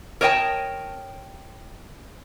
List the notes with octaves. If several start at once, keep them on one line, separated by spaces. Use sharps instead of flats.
A#4 C#5 D#5 F5 G5 A5